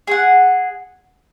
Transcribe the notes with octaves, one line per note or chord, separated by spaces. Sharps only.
G#4 F#5